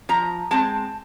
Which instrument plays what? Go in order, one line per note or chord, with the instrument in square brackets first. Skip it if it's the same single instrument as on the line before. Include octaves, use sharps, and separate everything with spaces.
[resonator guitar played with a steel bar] F3 A#5
G#3 C4 A5